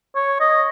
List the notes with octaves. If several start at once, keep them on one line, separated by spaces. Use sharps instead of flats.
C#5
D#5